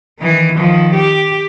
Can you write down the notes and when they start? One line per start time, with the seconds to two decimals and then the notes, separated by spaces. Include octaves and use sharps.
0.20 D#3 E3
0.56 D#3 F3
0.94 G4